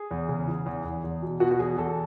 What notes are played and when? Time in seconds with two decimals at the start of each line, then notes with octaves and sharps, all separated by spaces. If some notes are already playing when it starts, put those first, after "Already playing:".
Already playing: G#4
0.11 E2
0.28 C#3
0.48 E3
0.66 E2
0.85 E2
1.04 E2
1.22 B2
1.40 B2 F#4
1.51 F#4
1.59 E2 G#4
1.78 E2 A4